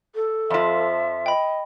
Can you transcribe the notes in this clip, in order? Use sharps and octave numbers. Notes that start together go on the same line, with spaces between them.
A4
F2 F3 E5
D#5 G5 B5